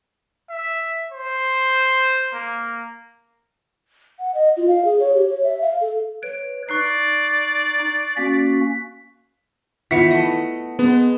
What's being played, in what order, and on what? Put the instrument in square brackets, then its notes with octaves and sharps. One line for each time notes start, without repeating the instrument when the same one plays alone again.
[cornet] E5
C5
A#3
[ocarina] F#5
D#5
F4
F5
G#4
C#5
G4
C#5
E5
F5
A4
[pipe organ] B4 C#5 [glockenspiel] D7
[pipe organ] D#4 [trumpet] D5 [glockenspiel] C#6 F#6 C7
[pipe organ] A#3 C#4 F#4 [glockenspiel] B6
[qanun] D#3 E3 B3 [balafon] F4 E5 F#5 [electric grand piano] B6 C#7
[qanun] A3 D#5
[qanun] G#3 [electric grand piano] B3